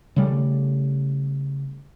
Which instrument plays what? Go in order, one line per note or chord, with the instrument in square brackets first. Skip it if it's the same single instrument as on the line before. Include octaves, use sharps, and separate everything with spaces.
[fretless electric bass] C#3 G3 A3